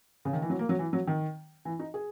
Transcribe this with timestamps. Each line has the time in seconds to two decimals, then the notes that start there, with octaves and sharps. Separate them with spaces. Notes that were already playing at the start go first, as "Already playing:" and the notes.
0.25 C#3
0.33 D#3
0.42 E3
0.50 F#3
0.59 A#3
0.69 F#3
0.79 E3
0.93 F#3
1.07 D#3
1.65 E3
1.79 D#4
1.94 G#4